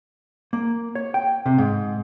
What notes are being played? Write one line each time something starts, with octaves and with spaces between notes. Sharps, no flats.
A#3
C#5
G5
C3
G#2